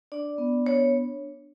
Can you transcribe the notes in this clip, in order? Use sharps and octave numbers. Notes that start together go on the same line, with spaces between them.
D4 D5
B3
D4 C#5